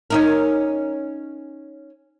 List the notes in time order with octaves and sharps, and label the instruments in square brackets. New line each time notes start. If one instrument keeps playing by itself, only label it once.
[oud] C#4 D#4 A#4